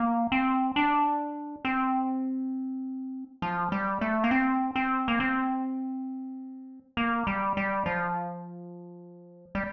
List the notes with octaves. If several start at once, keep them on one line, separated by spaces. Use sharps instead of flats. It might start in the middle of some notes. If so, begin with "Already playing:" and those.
Already playing: A#3
C4
D4
C4
F3
G3
A3
A#3
C4
C4
A#3
C4
A#3
G3
G3
F3
G3